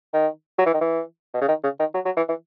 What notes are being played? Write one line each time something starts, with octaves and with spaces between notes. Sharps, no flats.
D#3
F#3
E3
D#3
E3
B2
C#3
D#3
C#3
D#3
F#3
F#3
E3
E3